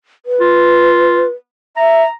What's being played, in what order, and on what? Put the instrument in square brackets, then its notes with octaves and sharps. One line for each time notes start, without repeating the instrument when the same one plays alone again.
[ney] B4
[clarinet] F4
[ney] E5 [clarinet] A#5